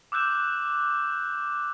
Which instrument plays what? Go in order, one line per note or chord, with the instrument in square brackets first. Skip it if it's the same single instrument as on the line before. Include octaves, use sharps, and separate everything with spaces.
[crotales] D6 E6 F#6 G6 E7